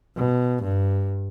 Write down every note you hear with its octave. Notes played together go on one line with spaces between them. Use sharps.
B2
G2